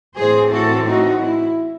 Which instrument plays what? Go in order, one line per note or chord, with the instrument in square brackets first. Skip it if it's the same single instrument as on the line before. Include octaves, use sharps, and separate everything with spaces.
[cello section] A2 E3 C4 G#4 C5
F#4 A4
D#4 F#4
E4